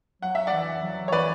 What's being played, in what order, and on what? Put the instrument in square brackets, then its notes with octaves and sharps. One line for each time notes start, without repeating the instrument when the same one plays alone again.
[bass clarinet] F#3 [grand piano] F#5
[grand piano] E5
D5 F#5
[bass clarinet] E3
F#3
[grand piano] C#5
[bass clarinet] E3 [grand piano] B4 D5